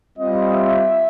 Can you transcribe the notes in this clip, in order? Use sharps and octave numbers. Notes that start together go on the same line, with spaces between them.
G3 C4 F4 D#5
E5